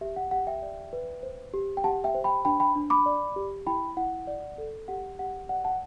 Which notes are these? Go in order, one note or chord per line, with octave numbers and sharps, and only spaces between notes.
G4 E5
F#5
G4 F#5
E5 G5
D5
B4
C5
G4
G5
G4 F#5 A5
E5 G5
C5
G5 B5
D4 G5 B5
G5 B5
D4
B5 D6
D5
G4
E4 G5 B5
E4 F#5
D5
A4
G4 F#5
G4 F#5
D5 F#5
F#5 A5